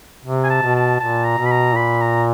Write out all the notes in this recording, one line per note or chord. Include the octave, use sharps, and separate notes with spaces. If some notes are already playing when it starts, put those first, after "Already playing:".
C3
G#5
A5
B2
A5
A#2 A5
A#5
B2
B5
A#5
A#2 B5
A#5